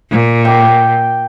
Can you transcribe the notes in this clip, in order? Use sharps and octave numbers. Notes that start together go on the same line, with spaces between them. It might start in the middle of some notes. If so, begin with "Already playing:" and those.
A#2
G5 D6